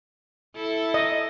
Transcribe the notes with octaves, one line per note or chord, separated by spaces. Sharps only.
E4 A4
D#5